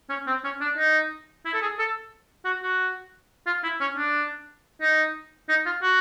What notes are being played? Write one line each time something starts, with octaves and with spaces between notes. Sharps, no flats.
C#4
C4
C#4
D4
D#4
E4
A4
G#4
A4
F#4
F#4
F4
E4
C#4
D4
D#4
D#4
F4
F#4